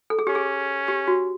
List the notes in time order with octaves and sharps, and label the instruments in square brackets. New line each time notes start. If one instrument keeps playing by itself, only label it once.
[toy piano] A4
G#4
[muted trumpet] C#4 [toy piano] G4
[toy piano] G#4
G4
F#4